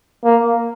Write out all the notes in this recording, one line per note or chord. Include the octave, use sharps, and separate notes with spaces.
A#3